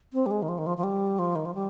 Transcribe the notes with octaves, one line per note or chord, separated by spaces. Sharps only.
C4
G3
G#3
D#3
F3
D#3
F3
F3
G3
F3
D#3
F3
G3